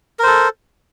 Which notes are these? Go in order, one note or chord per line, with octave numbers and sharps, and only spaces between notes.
A4 A#4 C5